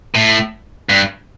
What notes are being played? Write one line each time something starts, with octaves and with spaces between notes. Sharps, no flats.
A2
G2